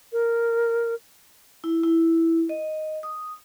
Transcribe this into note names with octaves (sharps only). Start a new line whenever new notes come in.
A#4
E4
E4
D#5
D#6